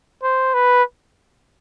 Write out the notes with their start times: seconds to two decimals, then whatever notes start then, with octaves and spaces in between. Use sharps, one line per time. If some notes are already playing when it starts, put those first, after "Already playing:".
0.23 C5
0.54 B4